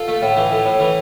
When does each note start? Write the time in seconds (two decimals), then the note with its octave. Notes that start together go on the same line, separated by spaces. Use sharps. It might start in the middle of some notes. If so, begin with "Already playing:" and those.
Already playing: F4 A4
0.08 A3
0.22 A2
0.37 E3
0.51 A2
0.66 A2
0.80 E3